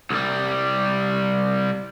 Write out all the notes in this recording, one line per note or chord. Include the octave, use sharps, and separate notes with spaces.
C2 G3